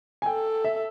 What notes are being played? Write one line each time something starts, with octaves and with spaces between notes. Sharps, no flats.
G#5
A4 G5
E5